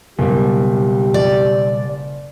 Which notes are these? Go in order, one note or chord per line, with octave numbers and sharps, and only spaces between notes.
F#1 B2 G3 G4
D5